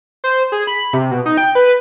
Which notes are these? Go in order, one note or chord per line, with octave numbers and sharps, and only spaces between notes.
C5
G#4
B5
C3
B2
D#4
G5
B4